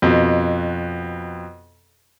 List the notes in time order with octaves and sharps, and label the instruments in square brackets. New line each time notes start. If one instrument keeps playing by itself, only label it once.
[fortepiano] F2 B2